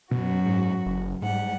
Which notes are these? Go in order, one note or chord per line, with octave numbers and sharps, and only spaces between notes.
F#2 B2 F#4
G#2
F#1
G#2 G3 F#5